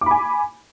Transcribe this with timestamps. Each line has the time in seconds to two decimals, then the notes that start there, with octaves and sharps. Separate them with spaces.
0.01 D6
0.06 B5
0.11 G#5